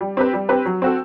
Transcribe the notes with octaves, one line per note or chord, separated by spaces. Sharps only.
G3
C4 G4 B4
G3
C4 G4 B4
F#3
C4 F#4 A4